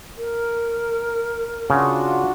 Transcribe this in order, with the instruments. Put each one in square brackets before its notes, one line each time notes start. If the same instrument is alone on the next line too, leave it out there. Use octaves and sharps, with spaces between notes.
[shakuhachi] A#4
[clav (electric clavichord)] C#3 [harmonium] D4 F4 F#4